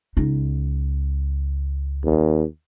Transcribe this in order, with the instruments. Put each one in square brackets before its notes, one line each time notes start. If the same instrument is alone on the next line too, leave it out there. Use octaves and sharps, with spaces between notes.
[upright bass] C#2 D#4
[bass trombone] D#2